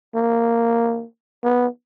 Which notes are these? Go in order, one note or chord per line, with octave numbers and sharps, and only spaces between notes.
A#3
B3